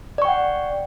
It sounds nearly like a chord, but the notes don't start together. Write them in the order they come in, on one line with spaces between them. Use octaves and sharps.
D5 C#6 G5 F#5